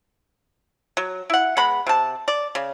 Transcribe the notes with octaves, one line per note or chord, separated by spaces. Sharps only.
F#3
E4 F#5
G#3 B3 F#5 B5
C3 A5
D5
C#3